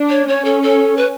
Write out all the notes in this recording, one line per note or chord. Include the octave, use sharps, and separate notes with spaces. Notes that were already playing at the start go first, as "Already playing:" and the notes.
Already playing: D4
C#5
C#4 C#5
A4
A4
B4